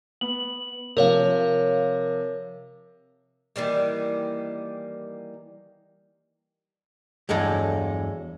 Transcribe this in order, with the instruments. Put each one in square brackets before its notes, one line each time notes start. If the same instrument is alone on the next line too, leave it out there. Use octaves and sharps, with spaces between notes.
[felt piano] B3 [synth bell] F#7
[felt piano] C3 F3 [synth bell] A#4 C#5 F5
[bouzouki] D#3 E3 G3 A#3
[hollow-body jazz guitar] E2 G2 F#3 G#3 A4